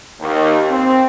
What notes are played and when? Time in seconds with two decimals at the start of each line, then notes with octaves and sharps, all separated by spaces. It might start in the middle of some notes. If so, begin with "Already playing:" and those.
0.21 D#2
0.70 C4